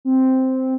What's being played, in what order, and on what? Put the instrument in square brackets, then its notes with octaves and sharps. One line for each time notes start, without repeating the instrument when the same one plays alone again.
[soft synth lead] C4